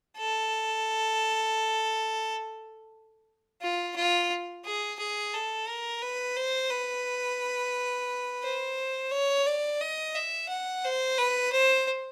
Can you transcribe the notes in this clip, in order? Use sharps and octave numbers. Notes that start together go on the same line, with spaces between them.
A4
F4
F4
G#4
G#4
A4
A#4
B4
C5
B4
C5
C#5
D5
D#5
E5
F#5
C5
B4
C5